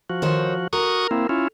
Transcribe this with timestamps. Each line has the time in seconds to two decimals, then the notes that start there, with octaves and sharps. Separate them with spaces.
0.10 F3 F#4
0.22 D#3 C5 C#5
0.73 F#4 A#4 C#6 D#6
1.11 A#3 C4 E4
1.29 C#4 E4 F4